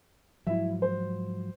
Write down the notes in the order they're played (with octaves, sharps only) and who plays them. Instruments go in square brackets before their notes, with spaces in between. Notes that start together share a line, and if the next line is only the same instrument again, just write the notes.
[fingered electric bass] G#2 F3 F#3 [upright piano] E4 E5
[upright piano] C5